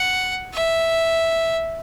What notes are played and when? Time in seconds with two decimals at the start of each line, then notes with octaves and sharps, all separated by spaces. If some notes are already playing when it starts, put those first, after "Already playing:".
Already playing: F#5
0.54 E5